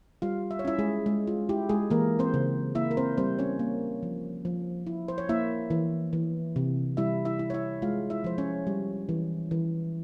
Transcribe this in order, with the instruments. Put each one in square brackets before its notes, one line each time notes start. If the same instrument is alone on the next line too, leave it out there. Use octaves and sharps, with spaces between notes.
[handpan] G3 F4 F5
E5
C#5
C#4 E4 E5
G#3 G#4
G#3
F4
E4 G4
G#3 G#4
E3 A#3 A#4
C4 C5
C#3
A#3 E4 E5
A#4
C4 C5
G3 C4 C5
C#4 C#5
A#3
F3
F3
E4
C5
C#5
A#3 E4 E5
E3
E3
C3
G3 E4 E5
E4 E5
E4
C#5
E4 E5
G#3 F4 F5
E4 E5
F3 C5
C#4 C#5
G3
E3
E3